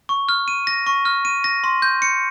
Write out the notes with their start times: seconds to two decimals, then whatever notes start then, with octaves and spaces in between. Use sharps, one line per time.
0.09 C#6
0.29 F6
0.48 D#7
0.67 A#6
0.86 C#6
1.05 F6
1.25 D#7
1.44 A#6
1.64 C6
1.82 G6
2.02 C#7